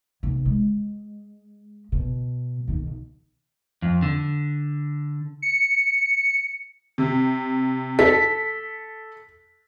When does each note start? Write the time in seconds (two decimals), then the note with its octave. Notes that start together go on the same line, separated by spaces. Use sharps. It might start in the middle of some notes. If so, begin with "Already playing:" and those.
0.23 B1 C3
0.45 G#3
1.92 B2
2.68 B1 D#3
3.82 F2
4.02 D3
5.42 C#7
6.98 C3
7.99 A4 B6